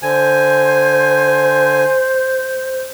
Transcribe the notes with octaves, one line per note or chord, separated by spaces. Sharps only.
D3 C5 G#5